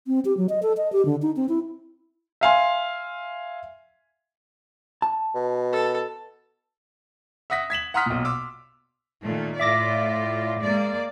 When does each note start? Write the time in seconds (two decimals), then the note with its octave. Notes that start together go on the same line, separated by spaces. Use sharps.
0.07 C4
0.25 G4
0.37 F#3
0.49 D#5
0.63 A4
0.77 D#5
0.93 G4
1.05 D3
1.22 D#4
1.36 C4
1.49 E4
2.41 E5 F5 G#5 C6
5.02 A5
5.35 B2
5.73 A4
7.50 E5 F#5 D#6 A#6 B6
7.70 G#6 B6 E7 F#7
7.94 F#5 A#5 C6 D#6 F6 B6
8.06 B1 A#2
8.25 C6 D6 E6
9.23 A#2 D#3 A3
9.60 A2 F4 D5 E5 D6 A#6
10.62 G#3 A#3 D5